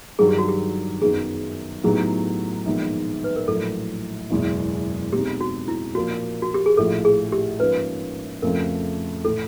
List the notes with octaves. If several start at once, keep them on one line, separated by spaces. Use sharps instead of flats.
G2 D#3 F#3 G#4
G4
F#4
G4
F#2 D#3 F#3 B3 D#4 G#4
A2 F#3 B3 D#4 G4 G#4
A#1 G#2 D#3 G#3 B3
B4
A#4
A#1 A2 F#3 A4
F#1 E2 B2 G#3
B2 G#3 C4 D#4 G4 G#4
F#4
E4
A#2 F3 A#3 F#4
F#4
G4
G#4
A#1 A2 F3 A4
G#4
G4
G#2 F3 A#3 C#4 B4
F2 C#3 F3 A3 A#4
A2 E3 A4